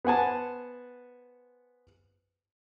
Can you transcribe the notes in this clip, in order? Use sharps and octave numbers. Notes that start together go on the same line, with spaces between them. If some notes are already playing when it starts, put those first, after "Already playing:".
B3 C5 F#5 G#5 A5